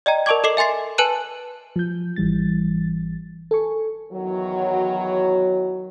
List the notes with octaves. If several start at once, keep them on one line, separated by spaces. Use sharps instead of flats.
D5 D#5 G5 A#5
A#4 D5 A5 C#6 D6 G#6
A4 D#5 D6 C7 F#7
E5 G#5 C6 A6 C7
B4 G#5 A5 F#6 D#7 E7
F3 G6
G#1 E3 G3 A6
A4 G#5 C#6
E2 D#3 E3 F#3